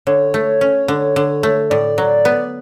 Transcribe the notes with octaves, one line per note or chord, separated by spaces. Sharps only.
D3 C#5
A3
C#4
D3
D3
A3
A2 D5
F#3
B3